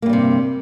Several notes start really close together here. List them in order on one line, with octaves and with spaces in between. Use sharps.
A#3 G2 G3 C3